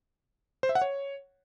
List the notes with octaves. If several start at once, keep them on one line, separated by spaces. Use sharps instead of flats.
C5
E5
F#5
C#5